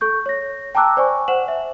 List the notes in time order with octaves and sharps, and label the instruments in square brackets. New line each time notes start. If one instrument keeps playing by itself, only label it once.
[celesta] A4 C#6 G6
C#5 A#6
G5 A5 A#5 D6 E6 F#6
C5 D5 G#5 C#6
C5 F#5 E7 F#7
E5